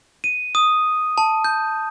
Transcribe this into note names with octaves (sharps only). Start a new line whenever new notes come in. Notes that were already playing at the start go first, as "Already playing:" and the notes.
D#7
D#6
A5
G6